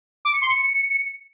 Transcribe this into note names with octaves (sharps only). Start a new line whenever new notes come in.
D6
C#7
C6
C#7